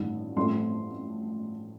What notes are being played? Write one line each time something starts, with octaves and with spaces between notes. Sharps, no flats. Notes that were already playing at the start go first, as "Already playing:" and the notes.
Already playing: A1 G2 D#3
A1 G2 F3 A3 C4 C6